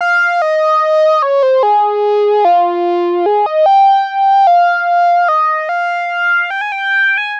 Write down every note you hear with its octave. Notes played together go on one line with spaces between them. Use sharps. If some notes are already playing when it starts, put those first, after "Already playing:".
F5
D#5
C#5
C5
G#4
F4
G#4
D#5
G5
F5
D#5
F5
G5
G#5
G5
G#5